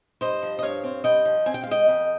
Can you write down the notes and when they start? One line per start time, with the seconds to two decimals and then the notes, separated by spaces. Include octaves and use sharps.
0.21 G2 C5 D#5
0.43 F3
0.59 D#5
0.63 G2 C#5 F5
0.84 C4
1.04 G2 D#5 G5
1.25 F3
1.46 C4 G#5
1.54 G5
1.63 F5
1.67 G#3 D#5 G5
1.88 F2